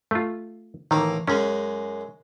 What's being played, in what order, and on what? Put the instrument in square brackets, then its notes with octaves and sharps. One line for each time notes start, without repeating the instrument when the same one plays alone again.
[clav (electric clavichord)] A3 F4
[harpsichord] A1 A#3 [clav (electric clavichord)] D#3
[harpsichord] F#2 G#3 [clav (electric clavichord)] C#4